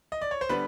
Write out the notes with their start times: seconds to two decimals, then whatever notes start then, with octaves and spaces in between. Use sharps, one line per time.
0.12 D#5
0.22 D5
0.31 C#5
0.41 C5
0.49 D3 G3 B3 B4